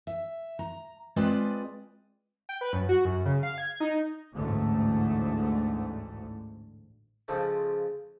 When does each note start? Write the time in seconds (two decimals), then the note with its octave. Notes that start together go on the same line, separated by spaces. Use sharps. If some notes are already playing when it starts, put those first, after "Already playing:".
0.07 E5
0.59 A#5
1.16 G#3 C4 F4 B4 D5 D#5
2.49 G5
2.61 B4
2.73 F#2
2.89 F#4
3.05 F#2
3.25 C#3
3.43 F5
3.58 G#6
3.80 D#4
4.35 A1 D2 G#2 D3 A3
7.28 C#3 F3 G#3 A4 C5